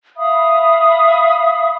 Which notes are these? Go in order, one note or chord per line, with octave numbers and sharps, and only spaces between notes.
E5 F5 B5 D#6